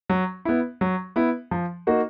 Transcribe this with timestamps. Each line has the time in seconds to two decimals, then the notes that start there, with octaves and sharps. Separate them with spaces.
0.10 F#3
0.45 B3 E4
0.81 F#3
1.16 B3 E4
1.51 F3
1.87 A#3 D#4 F#4